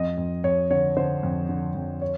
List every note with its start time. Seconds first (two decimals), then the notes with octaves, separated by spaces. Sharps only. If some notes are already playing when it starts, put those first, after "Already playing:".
Already playing: F2 D#5
0.18 F2
0.44 F2 C#5
0.71 D3 C#5
0.97 D3 C5
1.23 F2
1.49 D3
1.75 F2
2.02 C#5